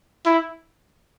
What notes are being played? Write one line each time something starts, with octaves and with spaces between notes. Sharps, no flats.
E4